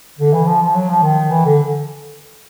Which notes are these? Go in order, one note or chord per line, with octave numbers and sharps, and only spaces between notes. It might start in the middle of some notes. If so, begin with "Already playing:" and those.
D3
E3
F3
F3
F#3
F3
D#3
E3
D3